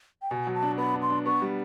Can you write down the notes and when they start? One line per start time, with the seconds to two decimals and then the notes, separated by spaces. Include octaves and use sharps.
0.22 G5
0.31 B2 G#5
0.47 F#3
0.55 A5
0.63 D4
0.78 B3 B5
0.94 D4
1.02 C6
1.10 D4
1.26 B3 C#6
1.42 G3